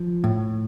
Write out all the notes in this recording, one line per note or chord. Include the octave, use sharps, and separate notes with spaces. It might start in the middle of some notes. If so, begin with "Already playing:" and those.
Already playing: F3
A2